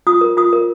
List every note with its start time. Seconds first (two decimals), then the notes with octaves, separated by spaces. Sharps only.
0.07 F4 D#6
0.21 A#4
0.37 F4 D#6
0.53 A#4